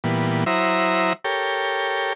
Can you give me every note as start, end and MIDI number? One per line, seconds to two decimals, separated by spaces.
0.04 0.44 46
0.04 0.44 52
0.04 0.44 55
0.04 0.44 59
0.46 1.13 54
0.46 1.13 64
0.46 1.13 72
0.46 1.13 76
0.46 1.13 82
0.46 1.13 87
1.24 2.13 67
1.24 2.13 69
1.24 2.13 70
1.24 2.13 73
1.24 2.13 79